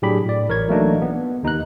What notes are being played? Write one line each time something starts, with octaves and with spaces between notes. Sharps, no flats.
A2 F#3 D4 G4 G#4 B5
A2 D5
A1 A#4 C#5 G#6
E3 F#3 A3 A#3 D4 D#4
B3
D#2 D#4 A#5 F#6